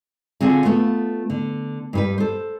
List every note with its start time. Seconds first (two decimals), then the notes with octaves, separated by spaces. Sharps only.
0.41 D3 C4 F4 F#4 G#4
0.65 A3 B3 F4
1.30 D3
1.93 G2 G3 B4
2.18 A4 C5